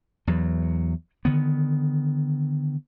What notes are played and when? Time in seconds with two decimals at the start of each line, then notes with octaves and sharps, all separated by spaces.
0.27 E2 F#3
1.25 D3 D#3 B3